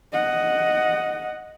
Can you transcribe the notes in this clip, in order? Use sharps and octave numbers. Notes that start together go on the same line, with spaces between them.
D#5 F#5